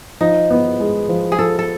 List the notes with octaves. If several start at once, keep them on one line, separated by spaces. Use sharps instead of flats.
F3 D#4
B3
G#3
F3
G#4
F3 A4
A4